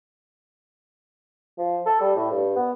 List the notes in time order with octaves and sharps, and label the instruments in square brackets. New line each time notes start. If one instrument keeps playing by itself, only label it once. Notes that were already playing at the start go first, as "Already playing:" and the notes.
[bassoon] F3
A4
G3
A2
G2
B3